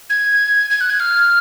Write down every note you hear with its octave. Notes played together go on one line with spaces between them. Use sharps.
G#6
G#6
F#6
G#6
F6